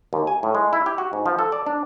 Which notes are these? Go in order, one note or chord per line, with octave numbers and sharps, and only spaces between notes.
D#2
G#5
A2
G#3
E4
G4
F#4
G#2
F3
A4
D5
D4